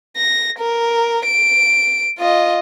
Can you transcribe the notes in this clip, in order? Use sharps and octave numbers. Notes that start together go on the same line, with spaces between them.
A#6
A#4
D7
F4 D#5